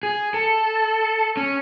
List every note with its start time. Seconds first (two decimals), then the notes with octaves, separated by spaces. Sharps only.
0.03 G#4
0.34 A4
1.37 C#4